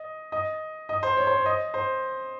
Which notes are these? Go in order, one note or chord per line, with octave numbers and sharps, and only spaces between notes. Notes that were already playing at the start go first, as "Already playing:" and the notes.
Already playing: D#5
D#5
D#5
C5
C#5
C5
C#5
D#5
C5